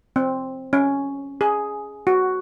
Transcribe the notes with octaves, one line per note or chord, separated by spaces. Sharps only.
C4
C#4
G#4
F#4